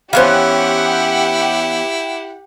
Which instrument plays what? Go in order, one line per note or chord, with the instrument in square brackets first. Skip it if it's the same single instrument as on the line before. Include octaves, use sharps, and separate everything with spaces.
[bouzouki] E3 B3 C#4 [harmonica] E4 [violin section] G4 F#5 [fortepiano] C5 F5